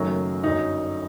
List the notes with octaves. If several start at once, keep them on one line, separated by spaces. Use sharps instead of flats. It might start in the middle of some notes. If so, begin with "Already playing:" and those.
Already playing: F#1 F#2 D#3 F#3 A3
G1 F#2 F#3 D#4